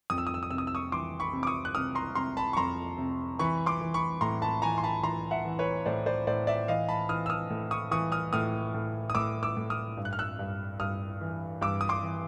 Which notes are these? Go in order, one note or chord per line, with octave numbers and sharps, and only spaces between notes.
F2 D#6
E6
D#6
E6
D#6
C3 E6
D#6
E6
C#6 D#6
E3 C6 D6
B5 C#6
C3
D6
C#6 D#6
F#6
C3 D#6 F6
A#5 C6
C3 A#5 C6
A5 B5
C#6
F2 A#5 C6
C3
E3 B5 C#6
C6 D6
E3
B5 C#6
A2 A#5 C6
A5 B5
E3 G#5 A#5
C6
A5 B5
E3 A#5 C6
E5 F#5
E3
B4 C#5
A2 C5 D5
C5 D5
A2 C5 D5
D5 E5
E3 D#5 F5
A5 B5
E3 D#6 F6
E6
D#6 F6
A2
C#6 D#6
E3 C#6 D#6
D#6 F6
A2 D#6 F6
A2
D#6
A2 D6 E6
D6 E6
A2
D#6 F6
G2
F#6
F6
E6 F#6
G2
G2 D#6 F6
E3
G2 D6 E6
D#6
C6 D6
E3